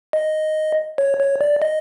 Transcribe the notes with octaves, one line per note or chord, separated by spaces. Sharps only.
D#5
C#5
C#5
D5
D#5